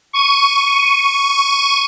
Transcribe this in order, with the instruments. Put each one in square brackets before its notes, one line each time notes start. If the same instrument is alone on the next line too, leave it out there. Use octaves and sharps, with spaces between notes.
[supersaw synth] C#6 D#7